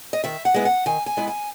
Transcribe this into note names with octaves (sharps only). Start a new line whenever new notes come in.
D#5
D#3 E5
F#5
G#3 B3 E4
F#5
D#3 G#5
G#5
G#3 B3 E4
G#5